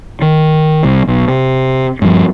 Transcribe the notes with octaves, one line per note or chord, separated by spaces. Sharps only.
D#3
C2
B1
C3
G2 F3